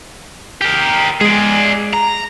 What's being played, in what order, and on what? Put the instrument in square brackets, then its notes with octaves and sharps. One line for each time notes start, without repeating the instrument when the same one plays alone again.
[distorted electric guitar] G4 A#4
[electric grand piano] G#3 [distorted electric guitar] G#4 D5
[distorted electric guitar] A#5